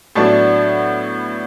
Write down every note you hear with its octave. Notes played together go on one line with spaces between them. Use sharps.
A2 F#3 B3 D4 A5